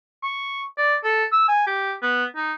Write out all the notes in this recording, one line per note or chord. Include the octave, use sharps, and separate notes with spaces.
C#6
D5
A4
E6
G#5
G4
B3
D#4